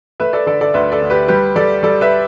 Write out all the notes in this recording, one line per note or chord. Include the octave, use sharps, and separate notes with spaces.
A3 B4 E5
A4 D5
D3 A4 D5
A4 D5
D2 B4 E5
A4 D5
D2
G4 B4
G3 G4 B4
G3 A4 D5
G3 A4 D5
B4 E5